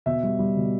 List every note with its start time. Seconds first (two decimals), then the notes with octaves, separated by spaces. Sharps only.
0.06 B2 E5
0.23 G3
0.39 G3
0.57 B2